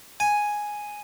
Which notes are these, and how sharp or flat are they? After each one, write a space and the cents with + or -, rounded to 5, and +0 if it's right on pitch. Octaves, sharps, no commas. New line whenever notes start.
G#5 +0